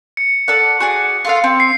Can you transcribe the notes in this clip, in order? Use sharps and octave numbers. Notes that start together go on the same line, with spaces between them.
C#7
A4 D5 F#5
F#4 G#4 D5
F4 A4 F5
C4
C7